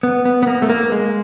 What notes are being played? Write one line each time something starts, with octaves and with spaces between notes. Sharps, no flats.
B3
B3
B3
A#3
A3
A#3
G#3